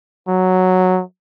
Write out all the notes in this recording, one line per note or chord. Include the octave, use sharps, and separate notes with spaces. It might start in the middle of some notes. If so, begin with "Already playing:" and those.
F#3